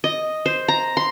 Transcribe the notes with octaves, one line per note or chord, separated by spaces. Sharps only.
D#5
C5
A#5
C6